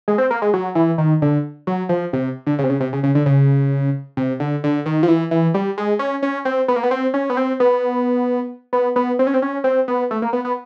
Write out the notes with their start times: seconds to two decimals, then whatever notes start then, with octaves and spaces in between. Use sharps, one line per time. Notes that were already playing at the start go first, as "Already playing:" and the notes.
0.08 G#3
0.18 C4
0.31 A#3
0.42 G#3
0.53 F#3
0.75 E3
0.98 D#3
1.22 D3
1.67 F#3
1.89 F3
2.13 C3
2.47 D3
2.59 C#3
2.64 C3
2.70 C#3
2.80 C3
2.93 C#3
3.03 C#3
3.15 D3
3.26 C#3
4.17 C3
4.40 D3
4.64 D3
4.86 D#3
5.03 F3
5.08 E3
5.31 E3
5.54 G3
5.78 G#3
5.99 C#4
6.22 C#4
6.45 C4
6.68 B3
6.76 A#3
6.83 B3
6.91 C4
7.14 C#4
7.30 B3
7.37 C4
7.60 B3
8.73 B3
8.96 B3
9.19 C4
9.27 C#4
9.34 C4
9.42 C#4
9.64 C4
9.88 B3
10.11 A3
10.22 A#3
10.33 B3
10.45 B3